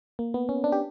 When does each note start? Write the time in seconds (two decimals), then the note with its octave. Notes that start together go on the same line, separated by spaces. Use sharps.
0.19 A#3
0.34 B3
0.49 C#4
0.64 D4
0.72 G4